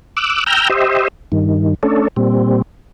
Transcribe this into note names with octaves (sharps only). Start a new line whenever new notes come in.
D6 E6 F#6
G5 A#5 E6 F6 G6
G4 C5 D#5 E5
G2 D#3
A3 C#4 D4 A4
A#2 G3 C4